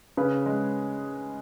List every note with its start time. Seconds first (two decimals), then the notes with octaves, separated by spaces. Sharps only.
0.17 C#3 B4
0.46 G#3